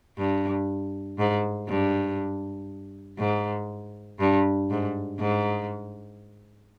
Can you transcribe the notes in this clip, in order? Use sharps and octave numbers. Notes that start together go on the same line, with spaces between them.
G2
G#2
G2
G#2
G2
G#2
G#2